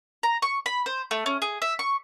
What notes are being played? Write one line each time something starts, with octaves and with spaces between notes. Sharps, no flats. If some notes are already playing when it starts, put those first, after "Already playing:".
A#5
C#6
B5
C5
A3
C#4
G#4
E5
C#6